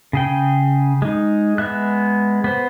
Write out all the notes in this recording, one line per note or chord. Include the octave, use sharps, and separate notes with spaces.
C#3 G#4 G5
G#3 D#4
G#3 B3 E5 F#6
B3 C5